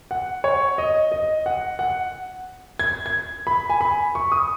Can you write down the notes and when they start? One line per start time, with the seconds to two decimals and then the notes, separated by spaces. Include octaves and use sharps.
0.11 F#5
0.44 C#5
0.78 D#5
1.12 D#5
1.46 F#5
1.79 F#5
2.79 G#6
3.06 G#6
3.47 B5
3.70 G#5
3.81 B5
4.15 C#6
4.32 D#6